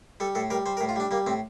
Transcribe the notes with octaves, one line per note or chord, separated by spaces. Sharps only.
G3 A4
A2 A4
G3 A#4
G3 C5
A#4
A2
F4
G3 D4
G3 A#3
A2 C4